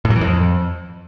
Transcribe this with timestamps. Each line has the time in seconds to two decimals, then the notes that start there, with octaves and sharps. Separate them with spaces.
0.05 A2
0.10 F#3
0.16 E3
0.21 F2